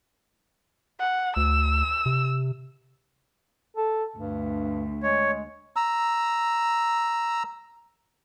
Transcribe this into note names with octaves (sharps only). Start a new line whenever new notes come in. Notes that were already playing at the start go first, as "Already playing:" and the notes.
F#5
D2 E6
C3
A4
D2 G2
G#3 C#5
A#5 E6